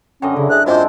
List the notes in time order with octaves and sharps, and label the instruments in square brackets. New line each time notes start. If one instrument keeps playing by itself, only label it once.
[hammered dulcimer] F#2 D3 D#5 [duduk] C#4 [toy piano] G5
[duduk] C#3 [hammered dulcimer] E4
[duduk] G#4 [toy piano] C5 E5 [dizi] F#6
[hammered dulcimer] G#2 C4 D4 [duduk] F4 [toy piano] F#4 D#5 G#5 [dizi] C5